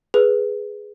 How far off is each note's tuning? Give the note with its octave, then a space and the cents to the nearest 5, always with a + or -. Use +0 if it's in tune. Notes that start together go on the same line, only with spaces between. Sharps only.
G#4 +0 B4 +0